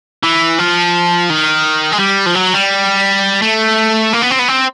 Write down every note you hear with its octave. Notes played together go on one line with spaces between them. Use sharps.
E3
F3
D#3
G#3
G3
F3
F#3
G3
A3
A#3
B3
C4
B3
C4